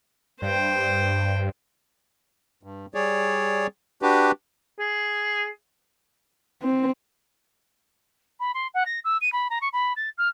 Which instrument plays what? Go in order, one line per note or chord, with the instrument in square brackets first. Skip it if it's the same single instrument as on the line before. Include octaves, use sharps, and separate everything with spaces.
[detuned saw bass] G2 [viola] C5 G5
[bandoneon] G2
G3 G#4 C#5 D5
D4 F#4 G4 B4
[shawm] G#4
[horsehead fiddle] C4
[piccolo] B5
C6
F#5
A#6
E6
D#7
B5
A#5
C#6
B5
A6
F6